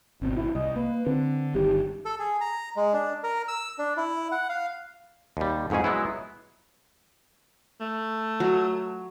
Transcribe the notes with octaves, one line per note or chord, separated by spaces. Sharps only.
G#1 B2 C4
E4
C2 D#5
A#3 B4
D3 C4
G1 G2 D#3 G4
A4
G#4
A#5
G#3
D4
A#4
E6
D4
E4
F#5
F5
D#2 G3
F2 G#2 B2 C#4 G#4
F#3 G#3 B3 E4
A3
F#3